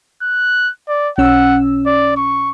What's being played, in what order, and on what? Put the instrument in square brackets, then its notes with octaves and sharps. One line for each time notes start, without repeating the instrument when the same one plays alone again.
[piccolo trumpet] F#6
D5
[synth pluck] B1 C#4 E6 [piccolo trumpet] F#5
[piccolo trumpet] D5
C#6